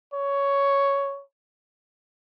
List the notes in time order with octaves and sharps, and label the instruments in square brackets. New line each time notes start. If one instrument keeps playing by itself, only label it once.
[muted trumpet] C#5